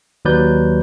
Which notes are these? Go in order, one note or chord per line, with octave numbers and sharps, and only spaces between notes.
D#2 F#3 B4 D5 G6